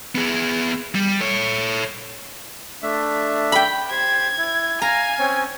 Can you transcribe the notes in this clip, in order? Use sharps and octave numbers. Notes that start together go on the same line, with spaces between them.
B3 G#4
G3
A4 C#5
A3 D4 E5
G5 B5
G4 C5 G#6
E4
F5 G#5 A#5
C4 C#4 C#5